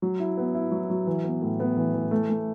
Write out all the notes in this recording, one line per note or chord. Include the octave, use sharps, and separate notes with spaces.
F#3
E4
B3
E4
F#3
F#3
E3
B3
A2
B3
E3
E3
A3
A3